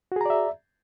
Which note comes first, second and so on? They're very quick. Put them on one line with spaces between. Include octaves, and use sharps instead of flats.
F#4 G#4 A#5 D5 E5